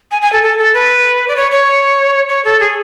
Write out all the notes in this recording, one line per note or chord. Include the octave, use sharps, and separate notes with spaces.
G#5
G#5
A4
A4
A4
B4
D5
C#5
C#5
C#5
A4
G#4